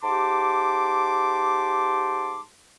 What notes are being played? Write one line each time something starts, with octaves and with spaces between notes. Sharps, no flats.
G#2 G4 A5 C6 D6